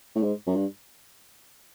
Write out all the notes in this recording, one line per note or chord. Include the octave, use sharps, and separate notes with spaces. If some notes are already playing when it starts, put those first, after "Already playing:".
A2
G#2
F#2
G2